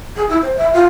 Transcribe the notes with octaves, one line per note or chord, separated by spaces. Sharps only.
G#4
E4
C5
E5
F4